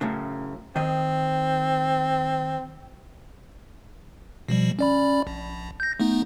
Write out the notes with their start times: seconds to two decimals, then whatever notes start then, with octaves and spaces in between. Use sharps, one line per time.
0.01 F#2 A2 C#3
0.76 D#3 C4 D#5
4.49 B2 F3 G3
4.79 C#4 D5 B5
5.27 A#1
5.80 G6 A#6
6.00 A3 B3 D#4